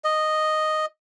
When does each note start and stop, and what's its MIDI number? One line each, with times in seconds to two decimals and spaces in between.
0.04 0.86 75